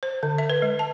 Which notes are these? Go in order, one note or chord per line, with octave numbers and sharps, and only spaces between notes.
C5
D3
E5
B4
G#3
A5